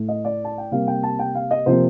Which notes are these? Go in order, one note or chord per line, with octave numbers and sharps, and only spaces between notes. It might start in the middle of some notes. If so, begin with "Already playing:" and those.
Already playing: A2 A3
D#5
D5
A5
G5
C3 G3 A#3 F5
G5
A5
G5
F5
D#5
C3 F3 A#3 C5